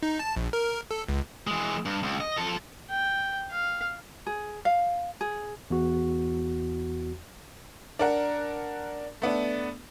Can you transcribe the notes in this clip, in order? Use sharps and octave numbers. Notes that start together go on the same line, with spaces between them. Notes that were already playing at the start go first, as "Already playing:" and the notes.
D#4
A5
A#1
A#4
A4
C#2
E3 G#3
G2
C#2
D#5
F3 A4
G5
F5
G#4
F5
G#4
E2 F#4
D4 A#4 F#5
A3 B3 D4